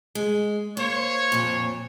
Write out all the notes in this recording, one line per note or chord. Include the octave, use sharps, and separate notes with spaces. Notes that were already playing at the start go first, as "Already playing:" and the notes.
G#3
A#3 C5 C#5
F2 A#2